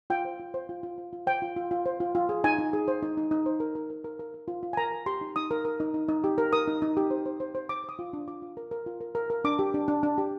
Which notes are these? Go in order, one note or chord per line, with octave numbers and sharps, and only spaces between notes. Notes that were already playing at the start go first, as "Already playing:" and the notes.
F4 G5
C5
F4
C5
F4
F4
F4
F4
C5 G5
F4
F4
F4
C5
F4
F4
G#4
D#4 G#5
D#4
G#4
C5
D#4
D#4
D#4
C5
A#4
A#4
A#4
A#4
A#4
A#4
F4
F4
G#5
A#4 A#5
A#4
G4 C6
D#4
D#4 D#6
A#4
A#4
D#4
D#4
D#4
G4
A#4
A#4 D#6
D#4
D#4
G4
C5
C5
C5
C5
C5 D6
C5 D#6
F4
D4
F4 D6
F4
A#4
A#4
F4
A#4
A#4
A#4
D4 D6
G4
D4
D4
D4
G4